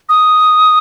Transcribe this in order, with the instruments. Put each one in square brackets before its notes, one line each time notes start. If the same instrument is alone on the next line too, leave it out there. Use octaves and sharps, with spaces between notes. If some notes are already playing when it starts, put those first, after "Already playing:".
[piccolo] D#6